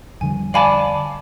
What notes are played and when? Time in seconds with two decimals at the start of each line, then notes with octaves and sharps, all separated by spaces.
0.21 F2 D3 G3 G#5
0.54 D5 F5 G#5 A5 B5 D6